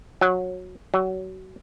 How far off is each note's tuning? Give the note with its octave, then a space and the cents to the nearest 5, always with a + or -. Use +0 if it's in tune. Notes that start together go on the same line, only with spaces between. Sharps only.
F#3 -15
F#3 +25